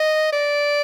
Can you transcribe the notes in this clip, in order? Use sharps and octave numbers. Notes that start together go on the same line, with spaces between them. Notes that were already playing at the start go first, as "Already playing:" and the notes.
Already playing: D#5
D5